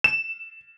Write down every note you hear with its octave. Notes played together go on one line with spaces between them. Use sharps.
E7